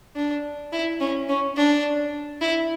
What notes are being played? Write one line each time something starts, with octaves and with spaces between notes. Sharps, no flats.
D4
E4
C#4
C#4
D4
E4